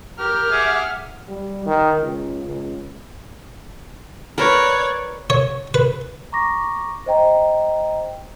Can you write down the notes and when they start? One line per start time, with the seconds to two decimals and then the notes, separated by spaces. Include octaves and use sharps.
0.19 G4 A#4 F6
0.51 G#4 E5 F#5 D6
1.28 G3
1.66 D#3
2.00 C#2
2.45 C#2
4.38 A#4 B4 C#5 D5
5.30 C#5
5.74 B4
6.32 A#5 C#6 D6 A#6
7.06 C5 D#5 G5 A#5